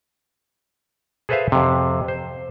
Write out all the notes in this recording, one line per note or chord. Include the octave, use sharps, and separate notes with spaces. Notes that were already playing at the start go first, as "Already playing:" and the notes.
G#4 A4 B4 C5 E5 F5
F2 C3
C5